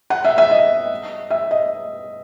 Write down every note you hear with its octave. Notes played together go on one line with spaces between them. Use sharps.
F#5
E5
E5
D#5
E5
D#5